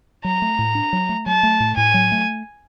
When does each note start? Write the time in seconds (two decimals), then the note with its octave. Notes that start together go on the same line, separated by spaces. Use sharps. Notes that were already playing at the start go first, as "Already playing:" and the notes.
0.24 F#3 A#5
0.42 A3
0.59 A2
0.75 D4
0.93 F#3
1.09 A3
1.26 F#3 A5
1.43 A3
1.60 A2
1.77 A2 G#5
1.94 F#3
2.12 A3